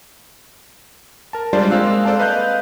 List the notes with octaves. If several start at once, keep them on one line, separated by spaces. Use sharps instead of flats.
A#4 A5
G3 G#3 D4 F4 C5 D5
G#3 A#3 C4 F5 E6 F#6
A4 C5 D5 F5 A5
B4 D#5 F5 F#6 G6